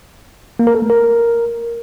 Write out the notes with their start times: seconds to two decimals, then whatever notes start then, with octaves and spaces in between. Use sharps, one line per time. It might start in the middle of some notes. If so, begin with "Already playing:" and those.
0.59 A#3
0.67 A#4
0.75 A4
0.82 A3
0.90 A#4